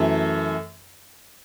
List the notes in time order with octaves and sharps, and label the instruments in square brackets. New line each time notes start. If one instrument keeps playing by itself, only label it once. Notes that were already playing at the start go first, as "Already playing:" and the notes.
Already playing: [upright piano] F#2 E3 A3